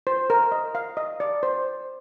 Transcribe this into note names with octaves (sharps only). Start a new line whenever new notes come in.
C5
A#4
D#5
F5
D#5
D5
C5